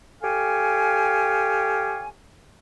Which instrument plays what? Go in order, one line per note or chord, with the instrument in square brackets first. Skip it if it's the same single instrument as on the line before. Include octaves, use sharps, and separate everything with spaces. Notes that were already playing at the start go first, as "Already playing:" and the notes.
[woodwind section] G4 A4 C#5 F5 G#5